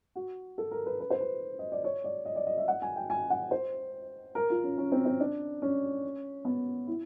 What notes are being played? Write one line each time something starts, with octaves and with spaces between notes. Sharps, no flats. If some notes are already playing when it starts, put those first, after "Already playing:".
F#4
A4
A#4
B4
B4
C5
B4
D#5
D5
C#5
D5
D#5
D5
D#5
E5
F#5
G#5
G5
G#5
F#5
C5
A#4
F4
C#4
C#4
C4
C4
D4
C#4
B3
E4